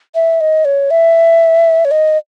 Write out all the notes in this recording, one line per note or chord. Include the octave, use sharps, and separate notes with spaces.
E5
D#5
C#5
E5
C#5
D#5